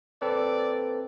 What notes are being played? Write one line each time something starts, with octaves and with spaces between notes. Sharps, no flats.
C4 A4 B4 D5